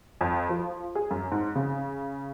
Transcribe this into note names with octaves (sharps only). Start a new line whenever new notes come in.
F2
F3
G#4
F#2
G#2
C#3